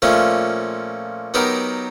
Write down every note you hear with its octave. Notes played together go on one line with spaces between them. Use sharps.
A#2 F3 A3 C#4
F#3 B3 D#4 G4 A#4